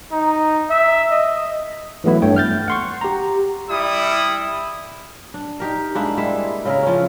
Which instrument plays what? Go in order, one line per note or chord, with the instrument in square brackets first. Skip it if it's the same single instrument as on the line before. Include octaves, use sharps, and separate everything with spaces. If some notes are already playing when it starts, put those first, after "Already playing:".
[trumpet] D#4
E5
D#5
[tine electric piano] E3 F#3 A3 B3 E4
G2 A3 C#5 G5
F6 G6 A6
F#5 C6 C#6
G4 A#5
[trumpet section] G3 E4 D#6
[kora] D4
D#4 G4 A#4
G#3 A#3 D4 E4
G3 G#3 E4 E5
C#3 E4 A#4
F3 C#4